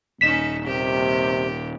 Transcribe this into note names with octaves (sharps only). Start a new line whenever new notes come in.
D#1 C#4 D#4 B6 E7
C3 D#3 G4